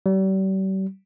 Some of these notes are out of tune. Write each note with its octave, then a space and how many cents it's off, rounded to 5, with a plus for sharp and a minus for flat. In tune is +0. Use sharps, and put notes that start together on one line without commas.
G3 -40